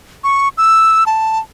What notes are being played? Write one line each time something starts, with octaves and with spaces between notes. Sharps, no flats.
C#6
E6
A5